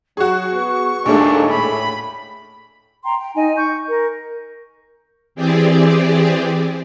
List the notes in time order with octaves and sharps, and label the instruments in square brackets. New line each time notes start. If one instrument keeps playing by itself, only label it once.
[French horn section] F#3 [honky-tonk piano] F#4 G#4 [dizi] C#6
[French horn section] B3
[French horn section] D#2 [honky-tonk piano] A#2 G#3 A3 [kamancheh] D4
[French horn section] A2 [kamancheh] B5
[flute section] G5 A#5 C6
G5
D#4 D#5 G#5
C#6 G6
A#4
[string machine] E3 C4 G4 G#4 D5